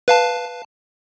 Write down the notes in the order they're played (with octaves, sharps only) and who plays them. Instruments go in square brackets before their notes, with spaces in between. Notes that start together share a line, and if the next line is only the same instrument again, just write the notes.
[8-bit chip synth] B4 F5 A5